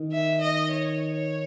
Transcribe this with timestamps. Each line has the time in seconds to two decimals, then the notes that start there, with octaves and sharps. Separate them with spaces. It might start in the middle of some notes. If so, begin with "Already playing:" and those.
Already playing: D#3
0.12 E5
0.41 D#5
0.70 C#5
1.13 C#5